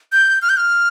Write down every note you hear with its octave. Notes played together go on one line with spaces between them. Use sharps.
G6
F6
G6
F6